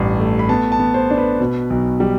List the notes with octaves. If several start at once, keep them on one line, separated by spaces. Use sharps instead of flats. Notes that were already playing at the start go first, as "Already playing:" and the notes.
Already playing: A1 G2
A3
B5
B3 A5
A5
B3
C5
D4
B4
B2
B1
G3